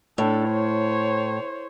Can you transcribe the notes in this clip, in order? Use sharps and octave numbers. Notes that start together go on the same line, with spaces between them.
A2 D4 A4
C5 C#5